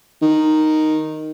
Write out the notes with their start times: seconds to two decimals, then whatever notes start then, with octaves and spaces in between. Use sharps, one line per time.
0.22 D#3